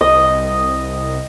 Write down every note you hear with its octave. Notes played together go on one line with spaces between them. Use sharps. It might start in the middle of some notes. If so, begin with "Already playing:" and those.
C2 D#5